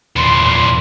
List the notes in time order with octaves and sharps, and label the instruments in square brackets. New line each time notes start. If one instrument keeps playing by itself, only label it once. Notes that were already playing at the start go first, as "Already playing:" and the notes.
[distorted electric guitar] E2 A#2 [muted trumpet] C6